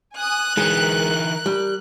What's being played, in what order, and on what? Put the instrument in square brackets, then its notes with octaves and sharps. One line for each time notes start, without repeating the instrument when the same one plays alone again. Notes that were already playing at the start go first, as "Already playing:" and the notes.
[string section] G#5 D#6 [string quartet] F#6
[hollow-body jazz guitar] B1 G#3 [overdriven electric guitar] E3 D#4 [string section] A#4
[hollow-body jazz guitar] G3